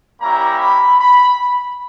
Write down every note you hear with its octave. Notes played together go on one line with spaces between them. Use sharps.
G3 A#3 C#4 E4 G4 A#5
B5
B5